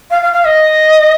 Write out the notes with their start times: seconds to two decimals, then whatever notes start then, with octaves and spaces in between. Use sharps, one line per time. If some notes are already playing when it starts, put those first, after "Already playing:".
0.11 F5
0.22 F5
0.33 F5
0.45 D#5